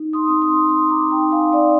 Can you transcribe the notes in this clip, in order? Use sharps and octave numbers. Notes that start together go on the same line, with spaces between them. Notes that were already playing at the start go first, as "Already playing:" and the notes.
Already playing: D#4
C6 D#6
C4
C6 D#6
C4 C6 D#6
A#5 D6
D#4 G5 A#5
F5 G#5
C4 D5 F5